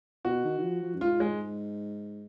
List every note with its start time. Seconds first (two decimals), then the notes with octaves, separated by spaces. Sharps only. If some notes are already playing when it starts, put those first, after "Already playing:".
0.25 B2 F#4
0.44 D#3
0.59 D#3
0.63 F3
0.83 F3
0.96 F#2
1.01 G#2 F4
1.20 G#3